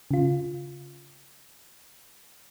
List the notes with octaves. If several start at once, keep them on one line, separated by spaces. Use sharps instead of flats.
C#3 F4